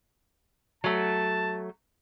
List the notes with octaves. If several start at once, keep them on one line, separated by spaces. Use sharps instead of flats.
F#3 A3 A5